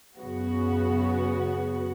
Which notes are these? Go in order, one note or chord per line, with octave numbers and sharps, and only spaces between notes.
F#2 C#3 B3 F#4